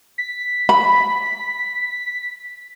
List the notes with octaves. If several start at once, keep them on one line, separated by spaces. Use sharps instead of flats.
B6
B5